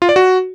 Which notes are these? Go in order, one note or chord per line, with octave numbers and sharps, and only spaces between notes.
F4
D5
F#4